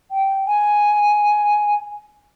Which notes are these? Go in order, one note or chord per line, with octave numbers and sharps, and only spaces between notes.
G5
G#5